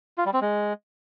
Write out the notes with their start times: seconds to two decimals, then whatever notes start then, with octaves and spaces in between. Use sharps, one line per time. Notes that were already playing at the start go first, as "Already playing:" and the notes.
0.18 F4
0.26 G3
0.33 C4
0.41 G#3